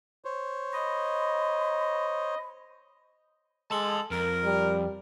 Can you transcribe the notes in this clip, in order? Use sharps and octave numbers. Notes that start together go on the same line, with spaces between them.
C5 C#5
D#5 B5
G#3 A4 A5 C6
F2 A#4
G3